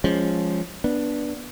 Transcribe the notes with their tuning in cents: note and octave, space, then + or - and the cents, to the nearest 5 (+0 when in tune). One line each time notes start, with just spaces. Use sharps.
F3 +0 G#3 -15 C#4 +5
B3 -15 D4 +0